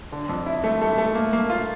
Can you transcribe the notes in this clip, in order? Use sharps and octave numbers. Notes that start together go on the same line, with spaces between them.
D3
F2
E4
A3
A3
A3
A#3
A#3
F4